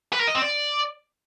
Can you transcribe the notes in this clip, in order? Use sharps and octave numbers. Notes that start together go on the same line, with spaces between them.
B4
A#4
D#5
C4
D5